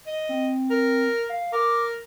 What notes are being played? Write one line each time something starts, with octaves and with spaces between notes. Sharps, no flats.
D#5
C4
A#4
F5
A#4 D6